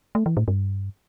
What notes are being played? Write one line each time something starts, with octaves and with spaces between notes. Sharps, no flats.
A3
E3
A2
G2